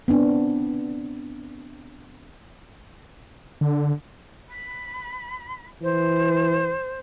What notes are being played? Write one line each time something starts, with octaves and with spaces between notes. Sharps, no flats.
B3 C4 D4
D3
B5
E3 C5